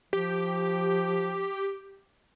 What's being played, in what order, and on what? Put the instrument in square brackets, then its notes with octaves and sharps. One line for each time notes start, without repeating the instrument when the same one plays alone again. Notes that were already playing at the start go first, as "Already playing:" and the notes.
[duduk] F3 [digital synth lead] G4